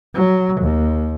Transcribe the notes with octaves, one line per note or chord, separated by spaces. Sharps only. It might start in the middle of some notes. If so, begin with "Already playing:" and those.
F#3
D#2